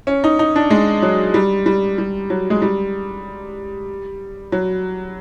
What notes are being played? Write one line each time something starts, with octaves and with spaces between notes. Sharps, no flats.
C#4
D#4
D#4
D4
G#3
F#3
G3
G3
G3
F#3
G#3
G3
F#3